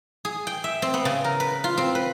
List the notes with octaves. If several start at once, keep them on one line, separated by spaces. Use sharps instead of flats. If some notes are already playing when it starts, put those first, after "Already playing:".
G#4
G5
E5
C4
B3
C#3
A#4
B4
F4
C4
B4